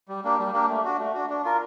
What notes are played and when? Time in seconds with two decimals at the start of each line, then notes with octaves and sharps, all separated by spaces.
0.08 G3
0.24 A#3 D4 G4
0.39 G3
0.53 A#3 D4 G4
0.69 A3
0.85 D4 F#4
1.00 A3
1.14 D4 F#4
1.30 D4
1.45 F4 A#4